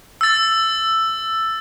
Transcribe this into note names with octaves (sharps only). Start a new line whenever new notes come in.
E6 A6